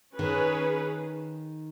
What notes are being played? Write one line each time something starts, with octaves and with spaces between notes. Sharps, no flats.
D#3 C#4 G#4 B4